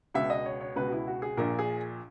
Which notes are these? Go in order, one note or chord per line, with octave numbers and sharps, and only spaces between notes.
C#2 B2 E5
D#5
C#5
C#5
C#2 B2 B4
F#4
E4
F#4
G#4
A#1 A#2 A#4
G#4